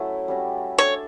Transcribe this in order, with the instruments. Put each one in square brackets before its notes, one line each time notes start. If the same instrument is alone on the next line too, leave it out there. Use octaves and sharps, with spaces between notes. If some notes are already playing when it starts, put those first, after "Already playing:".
Already playing: [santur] F#3 A3 C#4 E4 A4
G3 C#4 F#4
[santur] D4 A4 D5 [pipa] C#5